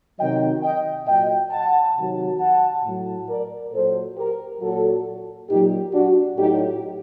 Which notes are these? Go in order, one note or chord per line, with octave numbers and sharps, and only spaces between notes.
C3 D#3 F#3 D#5 G5
D#5 G5
A#2 F#3 D#5 G5
F#5 A5
C3 D#3 F#3
F#5 A5
A2 F#3
A#4 D5
A#2 F#3 A4 C5
G4 A#4
A#2 F#3 F#4 A4
A#2 F#3 D#4 G4
D4 F#4
A2 F#3 D#4 G4